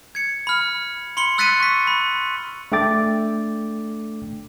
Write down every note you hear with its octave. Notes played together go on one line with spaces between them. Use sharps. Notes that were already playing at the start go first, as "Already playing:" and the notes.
G#6 C#7
B5 F6
B5 C6 C#7 G7
E6 F#6 A6 B6 C#7 D#7
C#6 B6
B5
A3 D4 A4 G5 D6 A6